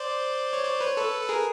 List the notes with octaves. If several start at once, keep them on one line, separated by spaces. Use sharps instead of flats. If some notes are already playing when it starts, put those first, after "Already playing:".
Already playing: C5 D5
C#5
C5 D5
B4 C#5
A4 B4
A4
G#4 A#4